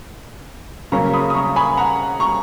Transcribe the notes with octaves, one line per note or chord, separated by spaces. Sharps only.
C#3 F#3 A#3 C#4 A#5 C#6
B5 D#6
D#6
A#5 C#6
G#5 B5
F#5 A#5
A#5 C#6